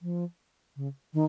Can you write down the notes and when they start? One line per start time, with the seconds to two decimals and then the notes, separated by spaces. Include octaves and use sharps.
0.02 F3
0.76 C#3
1.14 D#3